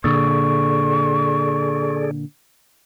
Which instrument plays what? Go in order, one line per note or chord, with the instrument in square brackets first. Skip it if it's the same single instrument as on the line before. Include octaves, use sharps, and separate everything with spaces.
[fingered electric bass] A#2 D3 [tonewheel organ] G#4 A4 D5 [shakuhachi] C#6